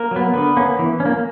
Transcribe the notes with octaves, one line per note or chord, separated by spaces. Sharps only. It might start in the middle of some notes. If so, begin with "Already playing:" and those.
Already playing: A#3 A#4
F#3 B3
D3 B3 B4
A#3 C#4
E3
C#4
A#3